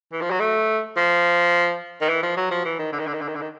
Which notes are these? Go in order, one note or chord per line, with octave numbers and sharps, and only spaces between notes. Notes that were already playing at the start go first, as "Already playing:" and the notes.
E3
F3
F#3
A3
F3
D#3
E3
F3
F#3
F3
E3
D#3
D3
D#3
D3
D#3
D3
D#3
D3
D#3